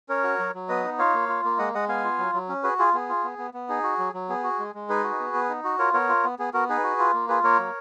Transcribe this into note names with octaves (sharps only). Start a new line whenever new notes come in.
C#4 A#4 C#5
F#4
F#3
F#3
B3 B4 D#5
D#4
F4 C#5 F5
A#3
F4
A#3
G#3 D#5 F#5
G#3 D#5 F#5
B3 F5 G#5
F4
F#3
F#3
C#4
F#4 G#4 B4
F4 G#4
B3 G#4
F4
B3
B3
B3
D#4 G#4
F#4
F#3
F#3
B3 G#4
F#4
G#3
G#3
D#4 G#4 B4
F#4
B3
B3
D#4
F#4
F4 A#4 C#5
B3 A#4 C#5
F4
B3
B3 G#4
B3 F#4 A#4
D#4 G#4 B4
F#4
F4
A#3
F4 G#4 B4
A#3 A#4 C#5
F#3